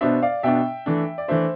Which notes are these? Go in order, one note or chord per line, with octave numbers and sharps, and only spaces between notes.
B2 B3 D4 C5 E5
D5 F5
B2 B3 D4 E5 G5
E3 A3 D4
D5
E3 A3 D4 C5 E5